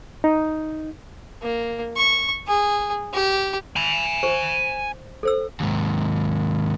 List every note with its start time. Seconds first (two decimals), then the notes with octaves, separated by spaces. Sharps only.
0.24 D#4
1.43 A#3
1.97 C#6
2.47 G#4
3.13 G4
3.76 G#5 B5
4.23 C5 C#6
5.23 A4 C5 E6
5.60 D#2 G#2